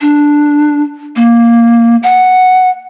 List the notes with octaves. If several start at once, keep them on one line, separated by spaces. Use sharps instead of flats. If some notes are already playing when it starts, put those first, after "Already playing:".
D4
A#3
F#5